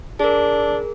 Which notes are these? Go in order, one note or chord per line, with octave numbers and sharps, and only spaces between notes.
D4 G#4 A#4